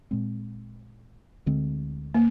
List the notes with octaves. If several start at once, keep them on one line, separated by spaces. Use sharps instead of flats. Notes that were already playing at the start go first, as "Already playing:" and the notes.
A#2 G#3 C4
D2 D3 G#3 C4
A#3